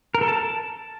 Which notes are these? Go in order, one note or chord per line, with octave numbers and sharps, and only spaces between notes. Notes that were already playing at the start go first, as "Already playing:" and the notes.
A#4
A4
A5